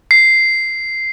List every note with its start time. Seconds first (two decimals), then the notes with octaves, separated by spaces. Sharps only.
0.11 C7